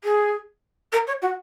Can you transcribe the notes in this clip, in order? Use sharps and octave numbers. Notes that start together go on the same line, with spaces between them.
G#4
A#4
C#5
F#4